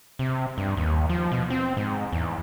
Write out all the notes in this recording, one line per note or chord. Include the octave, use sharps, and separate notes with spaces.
C3
G2
D#2
F3
B2
C4
G#2
E2